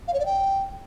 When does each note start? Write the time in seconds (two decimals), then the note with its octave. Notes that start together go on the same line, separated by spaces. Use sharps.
0.08 F5
0.14 C#5
0.20 D5
0.26 G5